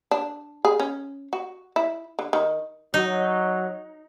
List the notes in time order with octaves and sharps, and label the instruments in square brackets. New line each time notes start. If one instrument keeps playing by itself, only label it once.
[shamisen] D4
G#4
C#4
F#4
E4
D3
D#3
[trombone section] F#3 [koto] D#4